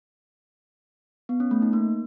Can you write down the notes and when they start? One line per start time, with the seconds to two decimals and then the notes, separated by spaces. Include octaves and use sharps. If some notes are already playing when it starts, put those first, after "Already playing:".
1.29 B3
1.40 C#4
1.51 A3
1.62 D#4
1.73 A#3